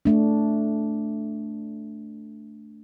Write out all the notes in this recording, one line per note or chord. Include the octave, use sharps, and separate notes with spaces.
A3 D4